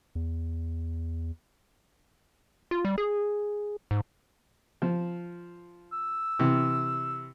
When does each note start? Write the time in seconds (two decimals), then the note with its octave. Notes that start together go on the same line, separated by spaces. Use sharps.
0.15 E2
2.71 F4
2.85 G3
2.98 G#4
3.91 G#2
4.82 F3
5.93 E6
6.39 C3 E3